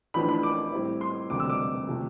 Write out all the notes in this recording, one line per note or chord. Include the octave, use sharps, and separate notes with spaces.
A1 A2 F3 B3 D4 B5
B5
D6
A2 G3 C4 E4
C6
E1 D2 C3 G3 C4 D6
E6
D6
C3 F3 A3